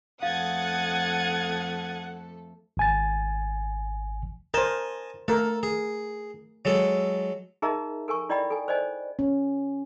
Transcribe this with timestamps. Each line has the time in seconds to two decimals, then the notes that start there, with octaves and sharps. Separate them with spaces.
0.22 F2 A3 A4 F5 F#5 D#6 G#6 A6
2.77 G#1 G#5 A6
4.54 A#4 C5 D#5 G#5 A5
5.28 A3 A4 A#4
5.63 G#4
6.65 F#3 G#3 A4
7.62 D#4 G#4 A#4 D#5 E5 A#5
8.08 A4 A#4 G#5 C#6
8.30 E4 D5 D#5 G5 B5
8.50 A4 G#5
8.68 C5 D5 D#5 G#5
9.19 C#4